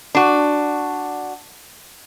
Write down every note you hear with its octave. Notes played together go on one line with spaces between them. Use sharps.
D4 F#4